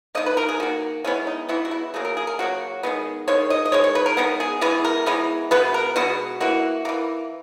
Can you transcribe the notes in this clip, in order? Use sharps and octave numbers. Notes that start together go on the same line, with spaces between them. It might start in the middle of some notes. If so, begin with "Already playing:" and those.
D#3 A#3 D#5
B4
A#4
G#4
D#3 A#3 F#4
E3 G#3 B3 C#4
D#4
E3 G#3 B3 E4
F#4
E4
C#3 F#3 A#3 G#4
A#4
G#4
A#4
C#3 F#3 A#3 F#4
D#3 G#3 B3
D#3 G#3 C#5
D#5
D#5
D#3 G#3 C#5
C#5
B4
A#4
D#3 G#3 B3
G#4
E3 G#3 B3 G#4
A#4
E3 G#3 B3
B2 G#3 B3 B4
A#4
B2 G#3 B3 F#4
E3 A#3 F#4
E3 A#3